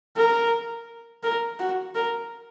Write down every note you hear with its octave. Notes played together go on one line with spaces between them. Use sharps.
A#4
A#4
F#4
A#4